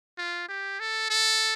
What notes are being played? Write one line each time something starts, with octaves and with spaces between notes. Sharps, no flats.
F4
G4
A4
A4